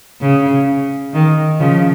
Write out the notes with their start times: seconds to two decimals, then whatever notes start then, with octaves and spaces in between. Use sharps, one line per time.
0.21 C#3
1.14 D#3
1.60 C#3 F3